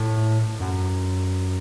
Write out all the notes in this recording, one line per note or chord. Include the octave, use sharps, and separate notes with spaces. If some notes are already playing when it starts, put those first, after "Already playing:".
Already playing: A2
F#2